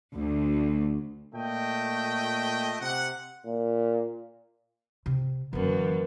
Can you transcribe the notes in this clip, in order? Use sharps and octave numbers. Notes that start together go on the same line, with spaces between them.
D2
A#2 A3 D#5 G5
C3 F#5
A#2
C3
F#2 D3 E3 A#3 B3